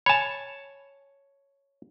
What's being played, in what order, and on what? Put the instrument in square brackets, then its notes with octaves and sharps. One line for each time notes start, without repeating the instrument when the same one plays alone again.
[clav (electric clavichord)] C#5 A5 [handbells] G#5 B5